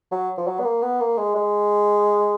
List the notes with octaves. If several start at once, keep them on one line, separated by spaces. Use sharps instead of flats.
F#3
F3
F#3
B3
A#3
B3
A#3
G#3
G#3